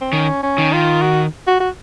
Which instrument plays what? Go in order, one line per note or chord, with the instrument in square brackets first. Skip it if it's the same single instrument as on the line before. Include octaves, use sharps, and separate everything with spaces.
[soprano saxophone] C4
[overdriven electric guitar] D#3 [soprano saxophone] C#4
[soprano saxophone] C#4
[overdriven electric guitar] D#3
[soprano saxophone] F4
F#4
F#4
F#4